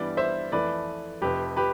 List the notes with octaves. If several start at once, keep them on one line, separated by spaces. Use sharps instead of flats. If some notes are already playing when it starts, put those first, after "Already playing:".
Already playing: G2 E3 G3 B3 D5
C5 E5
F2 E3 A3 B4 D5
F1 F2 C3 G4 B4
G4 B4